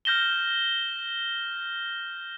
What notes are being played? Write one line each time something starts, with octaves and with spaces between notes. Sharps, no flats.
F6 G6 A#6 E7 G7